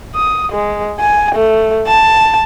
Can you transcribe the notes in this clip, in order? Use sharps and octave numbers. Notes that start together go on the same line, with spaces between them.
D#6
G#3
G#5
A3
A5